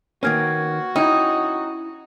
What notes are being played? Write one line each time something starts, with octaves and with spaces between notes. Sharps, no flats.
D#3 A#3 C#4 F#4 B4 F6 G#6
C#4 D#4 E4 G5 D#6